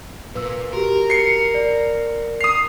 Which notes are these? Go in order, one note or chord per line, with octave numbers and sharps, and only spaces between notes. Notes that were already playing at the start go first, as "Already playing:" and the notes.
A#2 B4 E6
F#4 G4 A#4
C7 C#7
D5
D#6 C7 F7